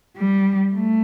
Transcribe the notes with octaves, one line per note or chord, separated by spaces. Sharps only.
G3
A3